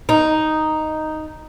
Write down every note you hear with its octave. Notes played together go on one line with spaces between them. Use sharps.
D#4